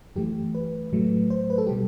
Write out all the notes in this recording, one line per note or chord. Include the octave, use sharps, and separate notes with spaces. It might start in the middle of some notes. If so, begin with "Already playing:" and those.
F#2 E3 A3 G4
B4
A2 F#3 A3
C5
B4
A4
B2 G3 G4